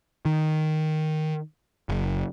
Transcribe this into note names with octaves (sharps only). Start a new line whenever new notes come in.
D#3
F#1